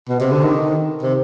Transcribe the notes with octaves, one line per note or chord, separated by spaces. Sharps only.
B2
C3
D3
D#3
C3